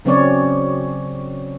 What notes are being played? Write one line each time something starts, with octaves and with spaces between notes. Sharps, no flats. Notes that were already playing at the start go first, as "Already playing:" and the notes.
C#3 F#3 C4 C#4 C#5 D5